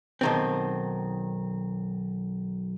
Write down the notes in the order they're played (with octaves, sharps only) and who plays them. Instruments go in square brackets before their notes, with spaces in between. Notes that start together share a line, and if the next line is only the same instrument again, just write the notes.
[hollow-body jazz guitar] B1 D#3 C4